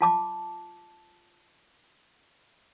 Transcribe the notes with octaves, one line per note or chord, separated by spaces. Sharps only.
F4 A5 D6